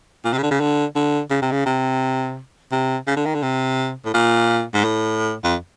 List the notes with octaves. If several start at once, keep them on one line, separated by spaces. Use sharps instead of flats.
A#2
C3
C#3
D3
C#3
D3
D3
C#3
C3
C#3
C3
C3
C#3
D3
D#3
D3
C3
A2
A#2
G#2
A2
F2